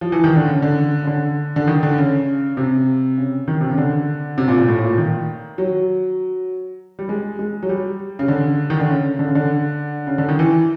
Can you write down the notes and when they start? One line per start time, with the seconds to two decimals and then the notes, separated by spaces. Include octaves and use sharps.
0.01 F3
0.12 E3
0.24 D#3
0.36 D3
0.47 C#3
0.62 D3
1.03 C#3
1.07 D3
1.56 D3
1.68 D#3
1.83 D3
1.98 C#3
2.57 C3
3.18 C#3
3.48 D#3
3.61 C3
3.70 C#3
3.78 D3
4.38 C3
4.48 A#2
4.58 A#2
4.68 A2
4.83 A#2
4.98 D#3
5.58 F#3
6.99 G3
7.09 G#3
7.39 G#3
7.63 F#3
7.69 G3
8.19 C#3
8.28 D3
8.70 D#3
8.80 D3
8.89 C#3
9.19 D3
9.27 C#3
9.35 D3
10.07 C#3
10.18 D3
10.29 D#3
10.39 E3